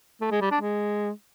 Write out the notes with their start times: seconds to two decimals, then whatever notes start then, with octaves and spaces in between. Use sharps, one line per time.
0.21 A3
0.31 G#3
0.41 G3
0.51 D4
0.61 G#3